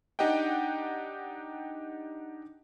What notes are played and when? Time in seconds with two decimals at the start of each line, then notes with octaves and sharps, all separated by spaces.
0.19 D4 D#4 G4 D#5 F#5 G5